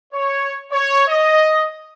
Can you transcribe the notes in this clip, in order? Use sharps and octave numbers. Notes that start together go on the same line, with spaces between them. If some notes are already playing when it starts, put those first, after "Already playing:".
C#5
C#5
D#5